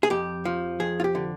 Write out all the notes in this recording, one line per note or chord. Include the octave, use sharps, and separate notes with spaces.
G#4
F2 G4
F3
F2 G#4
F4
G4
D3